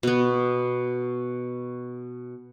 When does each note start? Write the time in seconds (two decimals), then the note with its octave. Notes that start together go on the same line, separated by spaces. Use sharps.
0.03 B2 B3